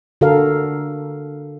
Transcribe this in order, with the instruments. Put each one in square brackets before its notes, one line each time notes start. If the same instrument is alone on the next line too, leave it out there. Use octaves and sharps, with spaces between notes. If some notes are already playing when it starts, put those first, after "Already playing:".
[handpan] D3 F#4 A4 A#4 F5